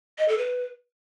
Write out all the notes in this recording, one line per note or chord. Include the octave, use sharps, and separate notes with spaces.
D#5
A4
B4